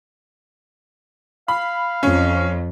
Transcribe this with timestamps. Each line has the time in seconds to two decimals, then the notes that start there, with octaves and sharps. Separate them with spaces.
1.48 F5 B5
2.03 F2 C#4